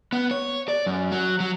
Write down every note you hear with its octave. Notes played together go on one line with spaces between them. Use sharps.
B3
C#5
D5
F#2
F#3
F#3